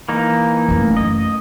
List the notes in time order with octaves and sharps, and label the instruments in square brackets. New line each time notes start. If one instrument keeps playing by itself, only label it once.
[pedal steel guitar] E3 A#3 D#4
[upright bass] F#2 A3
[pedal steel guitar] D#5